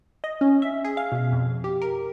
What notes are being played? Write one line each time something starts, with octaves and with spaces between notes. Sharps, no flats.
D#5
C#4
E5
G#4
F5
B2
F2
G4
A#4